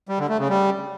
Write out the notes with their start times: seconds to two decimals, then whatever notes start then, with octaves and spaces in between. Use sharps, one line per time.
0.09 G3
0.19 D3
0.29 A3
0.39 C#3
0.49 G3